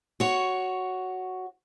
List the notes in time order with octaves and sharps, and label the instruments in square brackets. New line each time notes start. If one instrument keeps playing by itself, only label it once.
[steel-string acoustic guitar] F#4 C#5